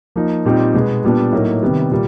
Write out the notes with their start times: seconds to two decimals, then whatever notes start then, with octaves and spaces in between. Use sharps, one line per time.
0.16 F3 A#3 D#4
0.45 A#2 G3 C4 D#4
0.74 B2 G#3 B3
1.04 A#2 G3 B3 D4
1.33 A2 F#3 A#3 D#4
1.63 C3 D#3 G3 B3
1.91 A#2 G3 A#3